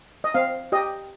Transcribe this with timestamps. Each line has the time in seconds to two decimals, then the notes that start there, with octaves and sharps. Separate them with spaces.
0.24 D#5
0.34 C4 F5
0.72 G4 D#5